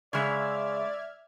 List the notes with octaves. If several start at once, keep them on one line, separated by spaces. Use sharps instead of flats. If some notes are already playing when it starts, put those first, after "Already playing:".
C#3 G#3 D5 E5 F6 G#6